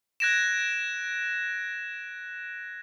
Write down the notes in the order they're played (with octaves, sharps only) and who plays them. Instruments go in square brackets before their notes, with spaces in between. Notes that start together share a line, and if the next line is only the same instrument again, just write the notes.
[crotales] F#6 G#6 A#6 D7 E7